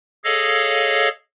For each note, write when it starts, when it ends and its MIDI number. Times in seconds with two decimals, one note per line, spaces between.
0.24 1.09 68
0.24 1.09 69
0.24 1.09 73
0.24 1.09 75
0.24 1.09 77